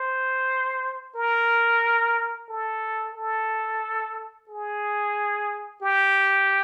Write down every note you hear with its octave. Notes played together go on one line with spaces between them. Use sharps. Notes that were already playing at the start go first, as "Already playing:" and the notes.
Already playing: C5
A#4
A4
A4
G#4
G4